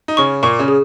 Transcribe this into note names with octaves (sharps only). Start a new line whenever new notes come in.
D#4
C#3 C#4 C#6
A#2 A#3 C#6
C#3 C#4
G#4